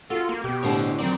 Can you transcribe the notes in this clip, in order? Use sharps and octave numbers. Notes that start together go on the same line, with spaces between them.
F4 F#4 A4
A#3
B2 G4
A2 D3 G3 D4 C5 C#5
F#3 C4 A#4 D5